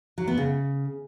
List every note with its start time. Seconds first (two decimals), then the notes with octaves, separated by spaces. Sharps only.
0.18 F#3
0.28 B3
0.37 C#3